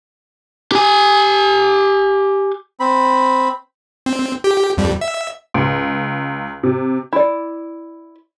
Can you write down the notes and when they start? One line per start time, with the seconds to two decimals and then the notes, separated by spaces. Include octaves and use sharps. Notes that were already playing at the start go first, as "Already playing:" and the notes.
0.72 G4 G#5
2.80 C4 B5
4.06 C4
4.44 G4
4.78 F2 G3
5.01 E5
5.54 C#2
6.63 C3
7.13 E4 D5